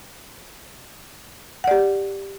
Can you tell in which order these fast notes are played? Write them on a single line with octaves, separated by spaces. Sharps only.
F#5 D5 G4